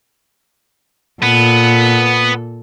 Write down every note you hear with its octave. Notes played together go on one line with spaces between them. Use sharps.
A#2 B3 A4